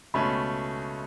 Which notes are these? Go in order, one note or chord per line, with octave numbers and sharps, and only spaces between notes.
C#2 B2 A3 C#4 B5